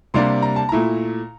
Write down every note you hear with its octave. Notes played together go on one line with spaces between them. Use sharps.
C3 G3 A#3 D4 C6
A#5
A5
A#2 A3 E4 A#5